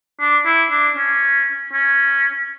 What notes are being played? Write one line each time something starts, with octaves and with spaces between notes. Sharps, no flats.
D4
E4
D4
C#4
C#4